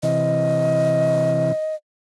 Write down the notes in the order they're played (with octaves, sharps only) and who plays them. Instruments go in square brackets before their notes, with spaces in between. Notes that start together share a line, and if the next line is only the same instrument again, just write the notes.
[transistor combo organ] C3 E3 [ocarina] D#5